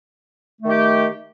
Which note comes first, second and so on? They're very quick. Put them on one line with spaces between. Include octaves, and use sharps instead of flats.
A3 D#3 G4